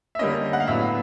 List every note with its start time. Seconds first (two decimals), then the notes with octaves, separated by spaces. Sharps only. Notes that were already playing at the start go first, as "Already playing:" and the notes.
0.15 E5
0.19 D3 G3 A#3 C#4 D#5
0.53 F#5
0.60 F5
0.67 A2 F#3 B3 D4 E5